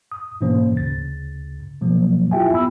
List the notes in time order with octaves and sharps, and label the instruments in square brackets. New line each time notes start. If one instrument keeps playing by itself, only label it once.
[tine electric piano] D#6
G#2 B2 E3 A#3 C#4 C5
D2 C#3 A6
B2 F3 F#3 A#3
E4 F4 G4 E5 G5 G#5
B3 B5 E6